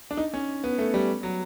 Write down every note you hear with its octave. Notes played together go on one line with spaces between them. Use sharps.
D4
D#4
C#4
B3
A3
G3
F#3